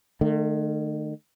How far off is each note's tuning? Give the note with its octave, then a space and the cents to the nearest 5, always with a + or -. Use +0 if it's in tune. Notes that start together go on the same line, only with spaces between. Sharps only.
D#3 -40 A3 +0